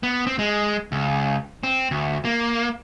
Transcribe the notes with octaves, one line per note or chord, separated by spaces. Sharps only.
B3
C4
G#3
C#2
C4
D2
A#3